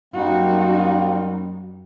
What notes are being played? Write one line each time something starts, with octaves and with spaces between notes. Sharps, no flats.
F#2 G3 A#3 C4 D#4 F#4